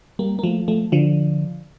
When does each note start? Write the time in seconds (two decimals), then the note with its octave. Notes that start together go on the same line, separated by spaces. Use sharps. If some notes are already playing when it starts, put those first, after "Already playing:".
0.19 G3 A#3
0.39 A#3
0.43 F3 A3
0.68 F3 A3
0.92 D3 F3